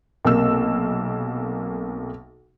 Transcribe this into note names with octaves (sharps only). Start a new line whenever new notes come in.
B1 C3 A#3 E6